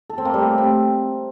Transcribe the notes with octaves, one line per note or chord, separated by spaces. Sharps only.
A4
C4
A#3
G3
A3
C4